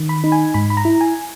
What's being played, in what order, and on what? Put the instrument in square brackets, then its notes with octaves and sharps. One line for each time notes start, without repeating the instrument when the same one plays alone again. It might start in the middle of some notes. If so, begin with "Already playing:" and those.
Already playing: [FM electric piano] D#3
B5
D#4
G#5
G#2 B5
B5
A#5
E4
G#5